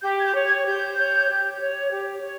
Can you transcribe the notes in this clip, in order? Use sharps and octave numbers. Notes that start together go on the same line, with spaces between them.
G4 G6
G#6
G6
C#5
G#6
G4 G6
C#5
G4
C#5
G4
C#5